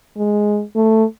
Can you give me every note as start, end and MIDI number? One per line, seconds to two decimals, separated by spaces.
0.17 0.62 56
0.75 1.04 57